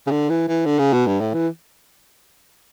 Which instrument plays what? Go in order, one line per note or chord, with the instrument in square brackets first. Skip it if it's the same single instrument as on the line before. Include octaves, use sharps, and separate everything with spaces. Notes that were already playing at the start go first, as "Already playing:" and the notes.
[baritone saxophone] C#3
D3
E3
E3
D3
C#3
B2
G2
A2
E3